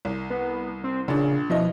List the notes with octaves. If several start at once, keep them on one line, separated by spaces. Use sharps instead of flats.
C2
B3
C4
A#1 C#3 D4
B2 F3 E4 D#5